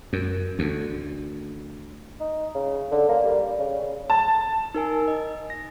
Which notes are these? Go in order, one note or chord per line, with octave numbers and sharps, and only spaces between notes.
F#2
D2
D#4
C#3
D3
A#3
G3
C#3
A5
D#4 A#4 G#5
D#5
A#6